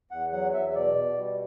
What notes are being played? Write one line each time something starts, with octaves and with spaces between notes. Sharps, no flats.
E2 F#5
F#3 F#5
E2 E5
E5
B2 D5
B2
G3